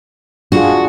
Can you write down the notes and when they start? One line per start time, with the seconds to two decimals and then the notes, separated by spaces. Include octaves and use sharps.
0.52 D4 F4 F#4 G#4